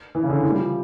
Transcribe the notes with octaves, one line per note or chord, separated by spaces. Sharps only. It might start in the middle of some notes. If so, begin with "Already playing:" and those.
E3
C#3
D3
E3
G3
F3